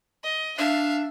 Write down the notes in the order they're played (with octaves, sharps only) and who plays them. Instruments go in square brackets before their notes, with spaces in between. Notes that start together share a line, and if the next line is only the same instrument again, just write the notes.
[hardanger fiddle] D#5
[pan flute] D4 [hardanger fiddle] E5 F5